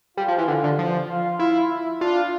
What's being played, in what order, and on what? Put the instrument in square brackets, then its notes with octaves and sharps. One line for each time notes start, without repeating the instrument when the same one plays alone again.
[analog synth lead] G3 [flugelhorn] F4
[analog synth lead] F3
E3
D3
D3
F3
[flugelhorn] F4
[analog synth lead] E4 [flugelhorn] F4
[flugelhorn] E4
[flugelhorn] D4 [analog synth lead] F4